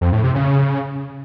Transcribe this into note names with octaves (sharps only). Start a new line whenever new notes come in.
F2
A2
C3
C#3